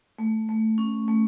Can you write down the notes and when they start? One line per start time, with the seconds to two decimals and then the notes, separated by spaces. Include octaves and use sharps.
0.18 A3
0.49 A3
0.78 C#4
1.08 A3